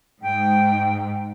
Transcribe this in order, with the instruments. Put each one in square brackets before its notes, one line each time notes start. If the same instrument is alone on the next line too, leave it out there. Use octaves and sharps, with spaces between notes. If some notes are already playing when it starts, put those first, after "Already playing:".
[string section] G#2 [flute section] G5